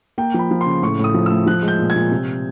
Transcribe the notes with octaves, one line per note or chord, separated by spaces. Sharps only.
A#3 G5
F3 B5
F3
C6
C#3
A2 C#6
A2 D#6
F3
E6
A3
F3 F#6
G#3
G6
A#2
G#6
A#2
C3